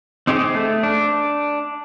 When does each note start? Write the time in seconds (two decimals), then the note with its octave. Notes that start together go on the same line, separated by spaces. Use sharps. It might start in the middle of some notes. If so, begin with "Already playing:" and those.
0.27 C4 D#4 G4 G#4 C5
0.55 A3
0.83 D4